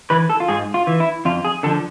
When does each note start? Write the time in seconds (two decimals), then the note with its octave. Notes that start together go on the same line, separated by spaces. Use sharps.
0.10 E3 B4
0.30 A4
0.40 F4
0.48 G#2 G#4
0.74 F4
0.87 E3
1.00 E4
1.25 F2 F4
1.45 G#4
1.63 D3 F3 A4